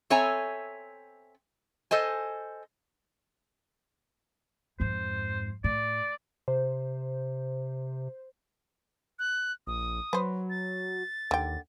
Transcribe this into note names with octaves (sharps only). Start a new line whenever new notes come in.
C4 A4 C#5 E5 G#5 A#5
A4 C5 D#5 G#5
F2 G#2 C5
A2 D5
C3 C5
F#6
A#1 D#6
F#3 B4 C5
A6
D#2 D3 G5